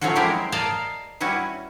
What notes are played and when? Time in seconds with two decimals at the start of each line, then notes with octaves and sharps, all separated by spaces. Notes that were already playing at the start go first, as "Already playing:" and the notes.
0.01 F3 F#3 A3 C#4 F4 F#4
0.15 G#3 E4 G4 A#4 C5
0.52 A#4 D5 D#5 F5 A5 A#5
1.20 G3 C#4 E4 F#4 B4